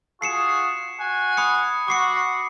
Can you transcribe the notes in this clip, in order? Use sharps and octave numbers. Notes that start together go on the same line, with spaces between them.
F4 F#4 G#4 C7 C#7 E7
F#4 F#5 G#5
B5 D#6 C#7
F#4 D6 C7 C#7